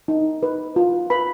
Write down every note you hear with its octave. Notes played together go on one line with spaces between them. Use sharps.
D#4
B4
F4
B4 B5